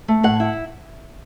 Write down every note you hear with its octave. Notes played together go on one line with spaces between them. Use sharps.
A3
A2 F#5
E4